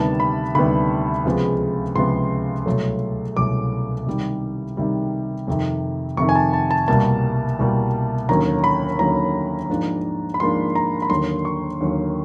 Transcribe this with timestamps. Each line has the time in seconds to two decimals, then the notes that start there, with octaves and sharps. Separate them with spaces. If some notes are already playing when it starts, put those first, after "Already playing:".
Already playing: D2 C3 D#3 G3 B3 A5
0.20 B5
0.55 D2 C3 D#3 G3 B3 B5
1.25 C#2 C3 F3 G#3 B3
1.96 C#2 C3 F3 G#3 B3 C6
2.66 C2 B2 F#3 A3
3.36 C2 B2 F#3 A3 D6
4.07 C3 D#3 G3
4.77 C3 D#3 G3
5.48 F2 C3 D#3
6.17 F2 C3 D#3 C#6
6.29 G#5
6.35 A5
6.53 A5
6.71 A5
6.88 C2 B2 G3 A#3 A5
7.59 C2 B2 G3 A#3
8.29 D#2 D3 F#3 A#3 C#4 A#5
8.64 B5
8.99 D#2 D3 F#3 A#3 C#4 A#5
9.69 G#2 F3 A#3 D4
10.34 B5
10.40 G#2 F3 A#3 D4 C6
10.75 A#5
11.02 B5
11.10 D#2 D3 F#3 A#3 C6
11.45 C#6
11.81 D#2 D3 F#3 A#3